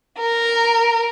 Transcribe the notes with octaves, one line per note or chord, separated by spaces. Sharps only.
A#4